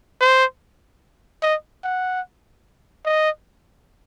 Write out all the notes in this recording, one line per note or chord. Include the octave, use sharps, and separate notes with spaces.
C5
D#5
F#5
D#5